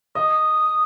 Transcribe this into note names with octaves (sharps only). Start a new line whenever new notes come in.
D#5 D#6